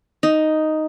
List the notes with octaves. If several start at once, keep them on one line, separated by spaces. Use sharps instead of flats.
D#4